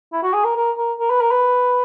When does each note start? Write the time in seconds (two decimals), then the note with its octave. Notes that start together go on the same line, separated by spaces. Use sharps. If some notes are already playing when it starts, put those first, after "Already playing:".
0.13 E4
0.23 F#4
0.34 G#4
0.45 A#4
0.56 A#4
0.78 A#4
0.99 A#4
1.10 B4
1.21 A#4
1.31 B4